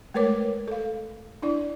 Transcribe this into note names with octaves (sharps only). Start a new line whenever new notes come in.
G#3 A3 A#4 B4 C#5 D6
A4 F5
D4 E4 D5